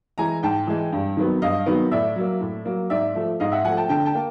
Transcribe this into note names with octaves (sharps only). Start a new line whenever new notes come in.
E3 G#3 G#5 A#5
G#2 G5 A5
E3 G#3
G2
D#3 F#3 B3
G2 D#5 F5
D#3 F#3 B3
A2 D5 E5
F#3 A#3
A2
F#3 A#3
G#2 D5 E5
F3 A3
G#2 D#5 F5
E5 F#5
F3 A3 F#5 G#5
G5 A5
D3 G5 A5
G5 A5
A#3